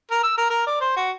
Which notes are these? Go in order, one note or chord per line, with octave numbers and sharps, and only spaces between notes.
A#4
E6
A#4
A#4
D5
C5
F#4